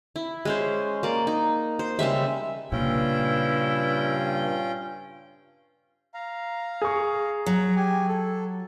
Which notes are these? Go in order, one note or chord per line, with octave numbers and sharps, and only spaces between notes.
E4
G#3 C#4 C5
A#3 D5
D#4
C5
C#3 G3 G#3 E5
G2 A#2 C#3 C#4 E4 F4 G5
F5 A#5
G#4 C#6
F#3 A#5
G4 G#5
A4